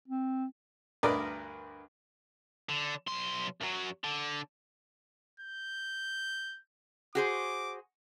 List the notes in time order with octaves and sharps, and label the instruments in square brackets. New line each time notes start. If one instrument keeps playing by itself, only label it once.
[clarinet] C4
[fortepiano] D2 G2 A#4 B4 D5 D#5
[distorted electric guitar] D3
B1 C6
F#2 F#3
D3
[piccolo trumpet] G6
[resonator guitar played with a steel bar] F#4 G#4 C5 [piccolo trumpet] D6